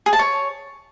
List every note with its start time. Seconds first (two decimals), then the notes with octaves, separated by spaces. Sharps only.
0.06 G#4
0.13 A5
0.19 C#5